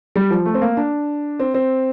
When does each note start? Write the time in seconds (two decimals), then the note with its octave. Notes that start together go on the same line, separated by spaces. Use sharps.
0.16 G3
0.30 F3
0.46 A3
0.54 C4
0.62 A#3
0.77 D4
1.39 C4
1.54 C4